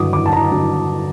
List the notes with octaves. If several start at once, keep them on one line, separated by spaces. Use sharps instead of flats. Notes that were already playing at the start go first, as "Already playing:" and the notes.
Already playing: G2 D3 F#3 D6 D#6
D6
A5
A#5
G2 D3 F#3